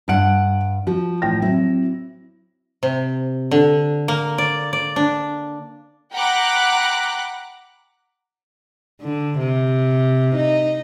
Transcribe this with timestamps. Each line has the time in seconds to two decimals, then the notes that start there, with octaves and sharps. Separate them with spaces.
0.08 G2 G3 F#5 D7
0.87 F3 F#4
1.22 A1 G5 A#6
1.42 F#3 C4 E4
2.83 C3
3.51 D3
4.08 A#3
4.38 D5
4.73 D5
4.96 D4
6.13 F#5 G5 A#5 B5 D6 F#6
9.01 D3
9.39 C3
10.36 D#4